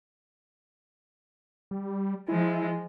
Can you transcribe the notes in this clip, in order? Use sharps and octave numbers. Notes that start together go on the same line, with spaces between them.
G3
F3 G#3 E4